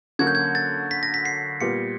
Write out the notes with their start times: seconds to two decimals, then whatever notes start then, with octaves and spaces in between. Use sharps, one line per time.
0.19 D3 F#3 A#3 C#4 F#4 G#6
0.27 G6
0.35 G#6
0.55 A6
0.91 B6
1.03 A#6
1.14 B6
1.25 C7
1.61 A#2 G3 B3 C#7